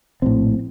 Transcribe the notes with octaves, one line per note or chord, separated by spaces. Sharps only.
A#1 A2 C4